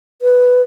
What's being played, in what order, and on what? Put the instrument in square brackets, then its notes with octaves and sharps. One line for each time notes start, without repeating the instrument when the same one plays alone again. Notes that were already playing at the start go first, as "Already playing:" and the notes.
[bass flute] B4